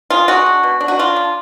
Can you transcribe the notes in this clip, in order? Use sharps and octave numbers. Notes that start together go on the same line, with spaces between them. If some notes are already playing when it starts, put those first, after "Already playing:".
G#3 F4
G#3 F#4
D4
B2
D4
F#4
D4 F4
D4